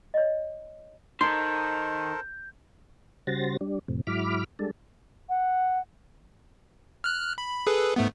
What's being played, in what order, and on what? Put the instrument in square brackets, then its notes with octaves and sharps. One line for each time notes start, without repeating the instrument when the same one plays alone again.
[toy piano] C#5 D#5
[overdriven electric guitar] D#3 [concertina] A4 A#4 C5 [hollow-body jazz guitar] C6 [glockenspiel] G6
[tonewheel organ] C#3 G3 F#4 C5 A6 A#6
G3 D4
F2 A2 C3
G#2 F#3 E4 B5 D6 F6
G3 G#3 D4 A4
[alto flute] F#5
[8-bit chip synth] F6 F#6
B5
G#4 A4 B4
G#2 A3 B3